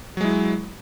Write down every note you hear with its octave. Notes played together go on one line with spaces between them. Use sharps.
F#3 G#3 E4